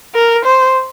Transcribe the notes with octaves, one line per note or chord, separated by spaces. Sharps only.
A#4
C5